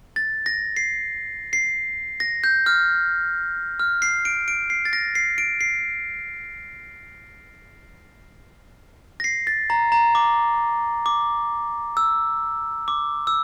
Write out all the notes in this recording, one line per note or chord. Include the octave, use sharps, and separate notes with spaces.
A6
A#6
C7
C7
A#6
G6
F6
F6
C7
D7
D7
C7
A6
A#6
C7
D7
C7
A#6
C7
A6
A#5
A#5
D6
D6
E6
D6
E6